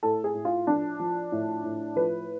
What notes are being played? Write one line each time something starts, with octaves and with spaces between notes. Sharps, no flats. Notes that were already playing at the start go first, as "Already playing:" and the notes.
A2 A4
G#4
A2
F4
F3 D4
F3
A2
A2
F3 B4